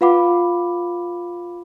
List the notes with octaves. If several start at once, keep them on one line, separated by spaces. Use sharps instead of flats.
F4 B4 F5 F#5 B5 D6